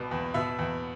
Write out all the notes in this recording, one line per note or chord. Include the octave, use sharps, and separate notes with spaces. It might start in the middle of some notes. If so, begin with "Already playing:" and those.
Already playing: C2 B2
E2
B2 E5
E2